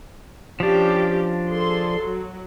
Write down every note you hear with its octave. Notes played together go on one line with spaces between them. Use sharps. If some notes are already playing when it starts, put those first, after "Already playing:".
F3 C#4 D4 G4 F5
G#4 A4 C6
F#3